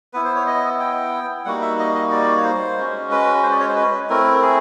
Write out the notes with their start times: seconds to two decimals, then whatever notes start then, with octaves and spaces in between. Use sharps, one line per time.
0.13 B3 E4 B4
0.25 C5
0.36 C#5
0.47 D#5
0.80 G5
1.45 G3 A#3 D#4 F#4 F#5
1.62 E5
1.79 D#5
1.95 D#5
2.11 D5
2.37 C#5
2.44 C5
2.78 G#3 C#4 F#4
3.11 B4
3.43 C5
3.52 D5
3.60 C#5
3.69 C5
3.76 B4
4.10 A3 C4 E4 A#4
4.42 G#4